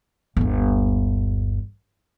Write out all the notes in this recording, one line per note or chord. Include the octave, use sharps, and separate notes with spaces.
G1 D#2